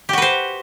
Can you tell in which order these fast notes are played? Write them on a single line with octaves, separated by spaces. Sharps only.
G4 F#4 B4 C5